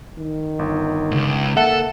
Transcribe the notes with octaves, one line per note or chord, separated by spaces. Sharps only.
D#3
G1
C#2 G#2
A#3 A4 E5 F#5 A5